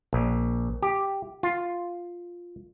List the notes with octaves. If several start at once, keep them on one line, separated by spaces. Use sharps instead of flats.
A#1
G4
F4